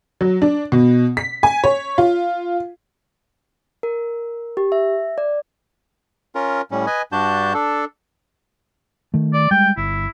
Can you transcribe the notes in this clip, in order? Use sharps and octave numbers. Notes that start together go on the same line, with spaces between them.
F#3
D4
B2
B6
G#5
C#5
F4
A#4
G4
E5
D5
C#4 F4 A#4
A2 G3 C#4
B4 D#5 G#5
G2 D4 F#4 A5 G6
D4 A4
D#3 A3
D5
G3 G#3 G5
G1 E4